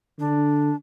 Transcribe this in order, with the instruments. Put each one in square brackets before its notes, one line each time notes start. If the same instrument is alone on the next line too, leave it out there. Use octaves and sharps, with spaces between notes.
[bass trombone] D3 [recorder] D4